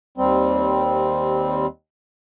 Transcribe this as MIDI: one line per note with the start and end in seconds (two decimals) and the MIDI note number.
0.18 1.66 39
0.18 1.66 55
0.18 1.66 60